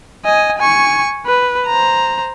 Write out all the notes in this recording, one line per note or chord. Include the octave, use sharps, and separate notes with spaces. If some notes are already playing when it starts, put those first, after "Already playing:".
D#5 G#5
G#5 C#6
B4
C5 A#5